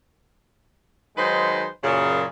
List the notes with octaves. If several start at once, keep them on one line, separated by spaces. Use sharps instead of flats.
D#3 F#3 G#3 D#4 B4 C5
F#2 A#2 C#3